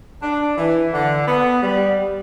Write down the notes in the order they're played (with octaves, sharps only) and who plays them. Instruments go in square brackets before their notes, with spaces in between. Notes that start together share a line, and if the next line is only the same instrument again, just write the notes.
[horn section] D4
E3
D3
B3
G3